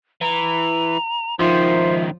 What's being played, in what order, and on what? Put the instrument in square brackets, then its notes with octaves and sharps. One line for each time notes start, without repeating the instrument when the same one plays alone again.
[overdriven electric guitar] E3 [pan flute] A#5
[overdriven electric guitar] C#2 D#3 [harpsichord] F3 [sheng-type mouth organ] C5 [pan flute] E5